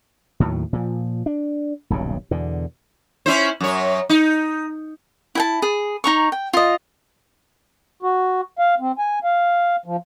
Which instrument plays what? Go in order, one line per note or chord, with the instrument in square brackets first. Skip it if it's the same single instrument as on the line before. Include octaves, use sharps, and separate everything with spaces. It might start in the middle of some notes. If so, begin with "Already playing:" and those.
[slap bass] D#2 A2 D#3 F#3
A#2 F3
D4
D#1 B1 G2 C#3
E2 B2 D3
[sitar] C#4 E4 C5
F#2 C#5
D#4
[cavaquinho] E4 G5 A5
G#4
D#4 A#5 C#6
G5
F4 D#5
[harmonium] F#4
F5
C4
G#5
F5
F3